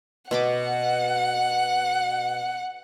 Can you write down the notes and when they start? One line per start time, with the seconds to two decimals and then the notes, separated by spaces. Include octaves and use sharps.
0.31 B2 F#5 B5 D6